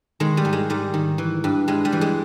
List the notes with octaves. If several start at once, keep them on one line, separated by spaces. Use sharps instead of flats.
D#3 G#3
G3
G#2
G#3
G#2 G3
D#3
E3
G2
G2 G#3
G3
E3
G#3